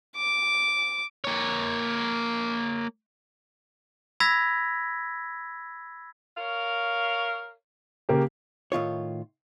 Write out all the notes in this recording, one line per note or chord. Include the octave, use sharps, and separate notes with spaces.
D6
A#3 C#5
B5 E6 G#6 A#6 B6
A#4 C#5 F5
C#3 A#3 G4
A2 D#3 F4 C#5